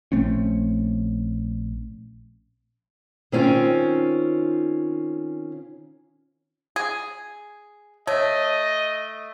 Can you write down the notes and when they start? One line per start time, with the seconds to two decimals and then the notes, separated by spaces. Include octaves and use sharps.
0.12 A#1 A3 C4 C#4
3.32 D#3 C4 C#4 F4
6.76 G#4
8.07 A3 C#5 D#5